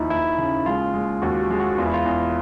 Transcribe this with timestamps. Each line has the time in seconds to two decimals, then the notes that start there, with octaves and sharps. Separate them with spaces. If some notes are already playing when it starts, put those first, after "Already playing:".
Already playing: D#2 F3 D#4 E4
0.10 D#2 E4
0.38 C#3
0.66 G#3 F4
0.94 G#3
1.22 D#2 F#4
1.41 G4
1.50 G#3
1.60 F#4
1.78 E2 F4
1.86 E4
1.94 F4
2.06 E2